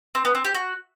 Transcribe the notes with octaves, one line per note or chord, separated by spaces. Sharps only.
C4
B3
C4
G4
F#4